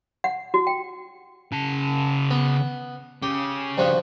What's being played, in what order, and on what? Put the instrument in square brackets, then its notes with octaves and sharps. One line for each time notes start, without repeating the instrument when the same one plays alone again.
[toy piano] F#5
F#4
G5
[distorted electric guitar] C#3 A5
[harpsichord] B3
[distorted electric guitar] C#3 [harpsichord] G4
[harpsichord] G2 F3 F#4